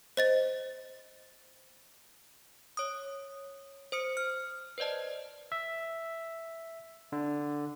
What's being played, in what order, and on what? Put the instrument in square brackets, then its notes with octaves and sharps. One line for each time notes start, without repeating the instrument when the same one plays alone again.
[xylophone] C5 D#5 A6
[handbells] C#5 D#6
C5 D#6 C#7
F6
B4 C5 D5 D#5 A5
[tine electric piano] E5
D3